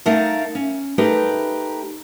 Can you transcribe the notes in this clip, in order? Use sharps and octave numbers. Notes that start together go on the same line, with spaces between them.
A3 D#4 A#4 F5 F#5 A5
C#4
A3 D#4 G4 A#4 B4